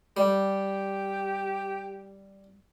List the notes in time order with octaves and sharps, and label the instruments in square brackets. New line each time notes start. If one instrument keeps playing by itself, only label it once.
[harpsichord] G3 [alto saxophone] G4